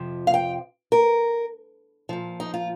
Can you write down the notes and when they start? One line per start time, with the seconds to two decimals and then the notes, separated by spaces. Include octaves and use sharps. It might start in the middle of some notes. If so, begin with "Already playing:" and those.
Already playing: F2 C3 F3
0.27 F5
0.34 G5
0.92 A#4
2.09 A#2 F3
2.40 D#4
2.54 F4